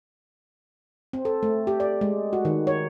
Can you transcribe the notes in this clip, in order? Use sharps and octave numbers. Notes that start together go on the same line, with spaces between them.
C4
A4
A3
G4
D5
G#3
F#4
D#3
C#5